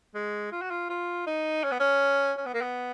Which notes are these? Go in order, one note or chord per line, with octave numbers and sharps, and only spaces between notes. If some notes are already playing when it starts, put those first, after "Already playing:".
G#3
F4
F#4
F4
F4
D#4
C#4
B3
C#4
C#4
B3
A#3
B3